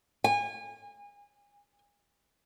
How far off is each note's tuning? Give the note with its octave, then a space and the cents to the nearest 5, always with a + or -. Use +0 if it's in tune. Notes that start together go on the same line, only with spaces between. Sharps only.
G#5 -30